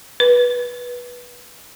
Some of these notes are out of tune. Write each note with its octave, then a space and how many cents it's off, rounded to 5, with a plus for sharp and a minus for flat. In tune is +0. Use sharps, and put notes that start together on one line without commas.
B4 -15